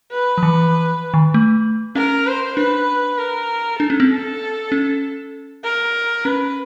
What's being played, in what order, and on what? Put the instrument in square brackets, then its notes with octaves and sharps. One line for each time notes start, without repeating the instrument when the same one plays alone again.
[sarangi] B4
[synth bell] F3
E3
D#3
A3
[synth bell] C#4 [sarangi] A#4
[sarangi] C5
[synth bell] D4 [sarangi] B4
[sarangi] A#4
[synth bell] D4 [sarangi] A4
[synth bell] C#4
C4
[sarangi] A4
[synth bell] C#4
[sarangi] A#4
[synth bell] C#4 [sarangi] B4